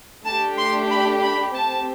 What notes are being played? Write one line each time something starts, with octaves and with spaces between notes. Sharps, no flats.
A3 D4 G4 A5
C6
B5
B5
C4 G4 A5